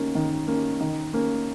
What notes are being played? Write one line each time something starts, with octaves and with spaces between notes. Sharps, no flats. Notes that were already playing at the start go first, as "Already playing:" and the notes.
Already playing: D#3 A#3 C#4
D#3
A#3 C#4
D#3
A#3 C#4